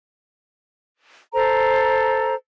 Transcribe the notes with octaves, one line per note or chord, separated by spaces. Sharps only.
A4 C5 A#5